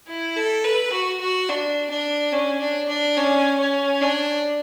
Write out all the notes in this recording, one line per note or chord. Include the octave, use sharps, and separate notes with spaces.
E4
A4
B4
F#4
F#4
D4
D4
C#4
D4
D4
C#4
C#4
D4